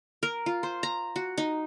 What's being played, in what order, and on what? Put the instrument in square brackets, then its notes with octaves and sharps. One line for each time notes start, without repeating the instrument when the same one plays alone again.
[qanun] A#4
F4
C5
A#5
F#4
D#4